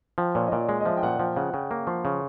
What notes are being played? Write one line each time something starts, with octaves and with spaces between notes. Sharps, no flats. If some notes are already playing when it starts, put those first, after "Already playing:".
F3 G5
A#2 C#5
D#5
A#2 D5
G#3 D#5
D#5
F3 E5
G5
A#2 F#5
F3 G5
C#3 F#5
C#3 G5
A#3 C#6
F3 C6
C#3 C#6